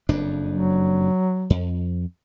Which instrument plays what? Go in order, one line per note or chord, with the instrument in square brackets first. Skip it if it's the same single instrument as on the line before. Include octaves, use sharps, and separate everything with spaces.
[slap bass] F#1 F2 D4
[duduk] F#3
[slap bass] F2